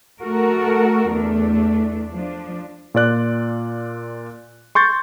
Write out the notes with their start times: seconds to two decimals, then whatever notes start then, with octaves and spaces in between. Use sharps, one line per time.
0.22 A3 F#4 A4 A#4
1.13 E2 A3 D4
2.12 F3 D4
2.94 A#2 F4 D5 F#6
4.75 C6 C#6 G6 A6